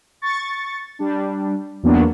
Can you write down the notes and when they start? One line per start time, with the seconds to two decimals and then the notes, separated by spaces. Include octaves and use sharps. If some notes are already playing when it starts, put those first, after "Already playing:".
0.22 C#6 A6
0.99 G3 D4
1.83 E2 F#3 A#3 B3 D4